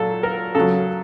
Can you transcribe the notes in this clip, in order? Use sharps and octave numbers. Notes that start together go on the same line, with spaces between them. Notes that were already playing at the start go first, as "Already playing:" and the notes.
Already playing: A#2 F#3 A4
A#4
C#3 F#3 A4